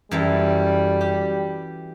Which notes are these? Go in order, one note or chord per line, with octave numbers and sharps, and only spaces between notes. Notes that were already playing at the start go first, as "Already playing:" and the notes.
F#2 E3 G3 A4
G4